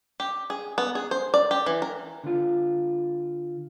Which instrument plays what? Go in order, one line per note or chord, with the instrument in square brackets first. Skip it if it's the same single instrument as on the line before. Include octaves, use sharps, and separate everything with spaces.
[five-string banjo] G4
G#4
B3
G#4
C5
D5
G4
E3
A#4
[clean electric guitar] D3 F4